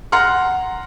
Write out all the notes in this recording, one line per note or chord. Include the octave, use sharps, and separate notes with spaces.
F#5 A#5 C6 F6